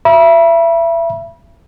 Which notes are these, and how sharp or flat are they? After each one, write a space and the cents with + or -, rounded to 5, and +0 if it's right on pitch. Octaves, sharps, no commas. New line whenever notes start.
E5 +25 B5 -35